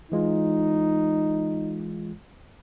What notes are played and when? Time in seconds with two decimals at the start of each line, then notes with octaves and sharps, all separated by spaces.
0.12 E3 G#3 D#4 F4